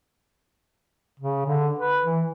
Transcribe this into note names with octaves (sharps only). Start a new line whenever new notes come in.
C#3
D3
B4
E3